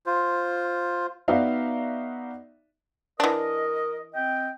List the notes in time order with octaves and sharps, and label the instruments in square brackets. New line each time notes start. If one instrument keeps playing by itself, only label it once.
[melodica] F4 C5
[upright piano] B3 D#4 F#4 D5 E5 F5
[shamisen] E3 D4 [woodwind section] A#4 D#5
[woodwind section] C4 D#5 G5